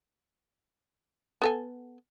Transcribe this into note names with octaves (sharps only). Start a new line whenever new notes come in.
B3 A4 G#5